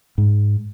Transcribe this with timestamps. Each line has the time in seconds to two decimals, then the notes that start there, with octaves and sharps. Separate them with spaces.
0.18 G#2